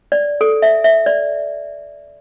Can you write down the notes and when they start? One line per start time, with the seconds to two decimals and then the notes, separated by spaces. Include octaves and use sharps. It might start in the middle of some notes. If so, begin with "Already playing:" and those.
0.12 D5
0.41 A4
0.62 E5
0.84 E5
1.06 D5